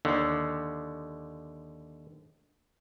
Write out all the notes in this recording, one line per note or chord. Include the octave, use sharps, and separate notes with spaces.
D#2 D3